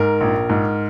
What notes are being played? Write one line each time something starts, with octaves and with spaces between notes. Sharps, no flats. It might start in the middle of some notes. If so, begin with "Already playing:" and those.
Already playing: G#2 A#4
A#1
G#2